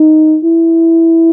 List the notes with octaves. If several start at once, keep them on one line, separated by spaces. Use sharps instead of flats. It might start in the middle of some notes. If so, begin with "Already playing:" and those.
Already playing: D#4
E4